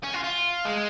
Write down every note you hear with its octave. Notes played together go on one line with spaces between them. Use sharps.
C#4
F4
F4
G#3